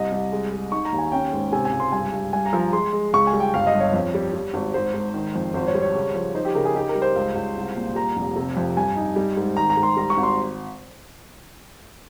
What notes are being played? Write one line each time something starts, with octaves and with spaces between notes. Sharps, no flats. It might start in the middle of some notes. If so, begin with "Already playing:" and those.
Already playing: C2 D#5
C2
G#3
G#3
D#4 C#6
A#5
D#2
G#5
C#4 G5
G#2
C3 G#5
G#5
C#2
C6
G2 G#5
G2
G2 G#5
A#5
F3
A#5
G#3 C6
G#3
C#2 C#6
G#5
G3
G5
G1 F5
D#5
G2
C#5
F2
G3
G3
G#1
G#2 C5
G#2
D#3
F2
G#1 C5
C#5
G3
C#5
C#3
F3
D#4 C5
G4
C#3 A#4
G#4
D#4 G4
A#4
G3
C5
C#2
C#2
C2
A#2
G3 A#5
F1
C3
F2
G2 G#5
D#4
G3
G#2
D#3 A#5
A#5
G#2
C6
G3 A#5
C#6
G#1
C6